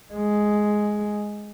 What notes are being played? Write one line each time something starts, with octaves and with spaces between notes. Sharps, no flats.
G#3